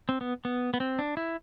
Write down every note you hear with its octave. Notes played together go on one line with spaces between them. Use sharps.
C4
B3
B3
B3
C4
D4
E4